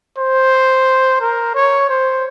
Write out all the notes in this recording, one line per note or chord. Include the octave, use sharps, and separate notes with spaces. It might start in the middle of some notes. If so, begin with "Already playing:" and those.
C5
A#4
C#5
C5